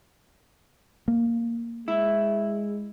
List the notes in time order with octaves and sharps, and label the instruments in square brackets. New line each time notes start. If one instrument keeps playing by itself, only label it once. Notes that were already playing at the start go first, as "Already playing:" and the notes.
[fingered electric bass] A#3
[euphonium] G#3 [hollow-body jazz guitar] E4